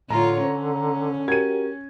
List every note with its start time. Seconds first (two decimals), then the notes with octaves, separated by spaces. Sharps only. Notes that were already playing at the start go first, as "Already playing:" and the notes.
0.10 A2 D3 F4 C#5 A#5
0.43 C#4 C5
1.28 F#4 G4 A#4 G#6 D#7